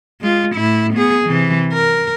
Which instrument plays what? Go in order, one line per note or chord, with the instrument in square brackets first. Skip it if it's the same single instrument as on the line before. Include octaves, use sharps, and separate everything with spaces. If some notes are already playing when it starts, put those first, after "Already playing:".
[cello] G#3 F4
A2 E4
B3 G#4
C3 E3
A#4